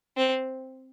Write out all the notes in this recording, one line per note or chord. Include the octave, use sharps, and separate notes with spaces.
C4